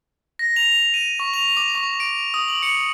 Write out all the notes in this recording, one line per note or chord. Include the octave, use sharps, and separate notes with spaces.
A#6
F7
D#7
C#6
F7
D6
C#6
D7
D#6
F#7
C#7